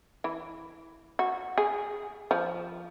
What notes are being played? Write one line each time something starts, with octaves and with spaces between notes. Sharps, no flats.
E3
F#4
G#4
F3